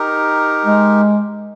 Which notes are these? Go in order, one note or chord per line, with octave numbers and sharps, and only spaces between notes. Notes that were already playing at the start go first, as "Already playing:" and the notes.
Already playing: D#4 G4 A#4
G#3